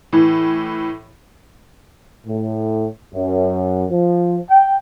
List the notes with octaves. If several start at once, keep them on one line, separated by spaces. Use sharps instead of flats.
A2 E3
A2
F#2
F3
G5